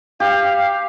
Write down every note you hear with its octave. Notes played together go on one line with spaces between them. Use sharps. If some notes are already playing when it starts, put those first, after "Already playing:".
G4 F5